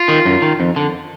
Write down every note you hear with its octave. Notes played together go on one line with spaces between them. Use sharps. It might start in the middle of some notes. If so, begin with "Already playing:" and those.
Already playing: F4
D#3
F#2
D#3
F2
D3